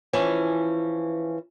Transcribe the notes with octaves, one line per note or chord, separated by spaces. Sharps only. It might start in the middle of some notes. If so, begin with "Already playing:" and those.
E3 F3 C#4